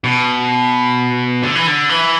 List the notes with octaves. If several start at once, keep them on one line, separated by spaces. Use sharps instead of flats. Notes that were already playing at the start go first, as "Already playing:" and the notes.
B2
D3
E3
D3
E3